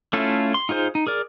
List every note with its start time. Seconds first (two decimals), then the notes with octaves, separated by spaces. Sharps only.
0.13 A3 C#4 E4 F4 A4
0.54 C6
0.69 D#4 F4 G#4 C5
0.95 D#4
1.07 G#4 A#4 D5